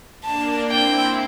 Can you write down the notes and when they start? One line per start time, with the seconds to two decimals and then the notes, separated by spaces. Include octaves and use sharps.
0.24 A#3 D4 A5
0.70 C4 E4 G5